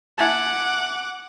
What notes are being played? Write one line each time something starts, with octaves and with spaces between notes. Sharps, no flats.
E4 F#5 G#5 A5 D6